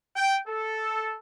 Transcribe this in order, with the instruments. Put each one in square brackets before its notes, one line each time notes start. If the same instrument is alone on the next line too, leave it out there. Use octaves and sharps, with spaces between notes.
[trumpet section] G5
A4